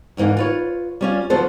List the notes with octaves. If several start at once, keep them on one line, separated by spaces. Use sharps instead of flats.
D2 G#2 E3 A#3 D#4
F4 B4 C#5
G3 C#4 F4
D2 F3 F#3 B3 A4 C5